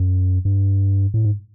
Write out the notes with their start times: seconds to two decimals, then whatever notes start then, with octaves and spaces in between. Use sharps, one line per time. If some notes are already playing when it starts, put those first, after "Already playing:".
Already playing: F#2
0.45 G2
1.14 A2
1.25 G#2